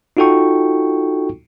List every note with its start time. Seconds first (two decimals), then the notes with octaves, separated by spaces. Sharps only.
0.17 D#4 F4 F#4 A4 G5 C#6